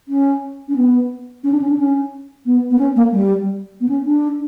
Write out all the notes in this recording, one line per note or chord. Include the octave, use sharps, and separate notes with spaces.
C#4
C#4
B3
C#4
D4
C#4
D4
C#4
B3
B3
C#4
A#3
G3
B3
C#4
D4